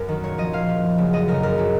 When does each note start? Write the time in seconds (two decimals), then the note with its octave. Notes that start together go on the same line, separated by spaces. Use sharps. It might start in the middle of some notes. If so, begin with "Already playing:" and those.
Already playing: F#2 A#4
0.09 D#3 F#3
0.24 A#2 C#5
0.38 F3 D#5
0.53 A#2 F5
0.68 F3
0.83 F#2
0.98 C#3 F#3
1.13 F#2 D#5
1.28 C#3 F#3 A#4
1.43 F#2 A#4
1.58 C#3 F#3